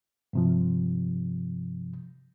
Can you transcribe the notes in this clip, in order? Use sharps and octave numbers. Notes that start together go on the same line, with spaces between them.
G2 C3 F3